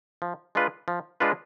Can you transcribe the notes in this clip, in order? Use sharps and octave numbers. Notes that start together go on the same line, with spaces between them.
F3
G#3 D4 F4 B4
F3
G#3 D4 F4 B4